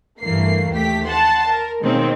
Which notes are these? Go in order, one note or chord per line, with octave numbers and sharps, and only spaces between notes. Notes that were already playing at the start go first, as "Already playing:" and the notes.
G2 E3 A3 A#3 C7
D#2 A3 G4 B6
F#5 A5 C6
A#4
B2 D#3 G#3 A#3 C4 C#4